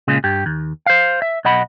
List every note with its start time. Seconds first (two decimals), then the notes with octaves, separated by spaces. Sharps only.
0.08 A#2 C#3 G#3
0.24 G2 G4
0.46 D#2
0.86 C5 F5
1.22 E5
1.45 B1 D#5 F#5 B5